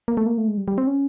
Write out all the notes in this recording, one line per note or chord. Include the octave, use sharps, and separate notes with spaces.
A#3
A3
A#3
A3
G#3
G3
G3
C4
C#4